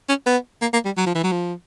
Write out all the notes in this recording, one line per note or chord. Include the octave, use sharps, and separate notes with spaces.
C#4
B3
A#3
A#3
G3
F#3
F3
E3
F#3
F3